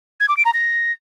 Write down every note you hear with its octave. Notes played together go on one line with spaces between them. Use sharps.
G#6
D6
D7
A#5
A#6